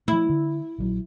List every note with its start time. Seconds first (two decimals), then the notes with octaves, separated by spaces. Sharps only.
0.08 F3 A3 E4
0.29 D3
0.78 A#1 E3 F#3